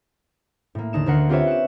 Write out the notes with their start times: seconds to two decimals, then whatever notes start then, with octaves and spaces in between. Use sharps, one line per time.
0.75 A2 A#3
0.93 D#2 D3 D#4 E7
1.06 D2 D3 A#4 F#5 C7
1.29 C4 F4 G4 B4 C#5 E5
1.47 F#5 E7